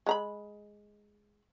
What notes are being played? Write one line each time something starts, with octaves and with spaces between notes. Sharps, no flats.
G#3 A#5 B5